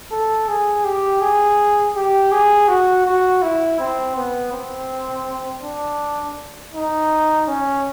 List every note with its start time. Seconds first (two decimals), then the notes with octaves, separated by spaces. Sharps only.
0.12 A4
0.48 G#4
0.85 G4
1.21 G#4
1.96 G4
2.32 G#4
2.68 F#4
3.06 F#4
3.42 E4
3.79 C4
4.16 B3
4.52 C4
5.63 D4
6.74 D#4
7.48 C#4